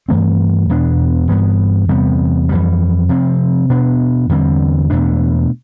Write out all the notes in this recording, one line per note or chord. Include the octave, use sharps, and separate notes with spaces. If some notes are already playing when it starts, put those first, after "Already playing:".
G2 E3 A3 C4
E2 B2 B3 D4
G2 E3 B3
E2 C3 G3 B3
F2 E3 G3
C3 F3 C4
B2 B3 D4
E2 D3 G3 C4
E2 B2 A3 D4